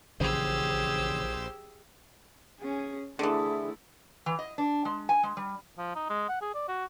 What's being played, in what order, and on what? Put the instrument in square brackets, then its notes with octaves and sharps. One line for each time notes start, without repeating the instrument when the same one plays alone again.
[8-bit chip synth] A#1 C5 [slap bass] C#3 E3 F#3 [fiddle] G4 E6 [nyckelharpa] G#4
[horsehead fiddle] C#4 G#4
[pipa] D3 E3 [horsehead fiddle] A3 E4 [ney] G#4
[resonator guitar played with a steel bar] E3
D#5
D4
G#3
G#5
G#3
G3
[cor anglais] F3
D#4
G#3
F#5
G#4
D5
F#4